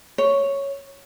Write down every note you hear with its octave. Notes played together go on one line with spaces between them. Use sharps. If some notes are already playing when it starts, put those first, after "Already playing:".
C#5